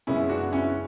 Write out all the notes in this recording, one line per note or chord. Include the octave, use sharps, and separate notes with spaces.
F#2 C#3 G#3 B3 C#4 E4
D4 F#4
C#4 E4